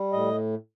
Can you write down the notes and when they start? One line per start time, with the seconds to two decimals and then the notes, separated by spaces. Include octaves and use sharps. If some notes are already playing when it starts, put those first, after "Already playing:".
Already playing: G3
0.12 A2 D#5